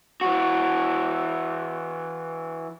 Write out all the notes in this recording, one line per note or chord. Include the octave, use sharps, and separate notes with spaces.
E3 F#4